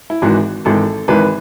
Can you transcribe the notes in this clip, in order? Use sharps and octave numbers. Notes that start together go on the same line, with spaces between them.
E4
G#1 G#2 E3 F#4
G#1 G#2 E3 A4
G#1 G#2 E3 B4